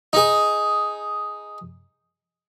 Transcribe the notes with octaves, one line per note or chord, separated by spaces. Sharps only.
D#4 G#4